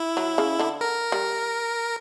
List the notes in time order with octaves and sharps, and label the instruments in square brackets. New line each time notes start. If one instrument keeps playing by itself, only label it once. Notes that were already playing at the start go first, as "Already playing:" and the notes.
Already playing: [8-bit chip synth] E4
[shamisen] F#3
C#3
D3
[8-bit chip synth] A#4
[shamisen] G3